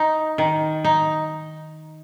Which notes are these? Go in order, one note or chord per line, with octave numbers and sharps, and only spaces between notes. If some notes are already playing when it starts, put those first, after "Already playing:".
Already playing: D#4
D#3
D#4